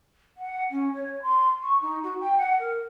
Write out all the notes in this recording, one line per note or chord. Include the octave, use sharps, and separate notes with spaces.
F#5
C#4
C#5
C6
C#6
D#4
F#4
G5
F#5
A#4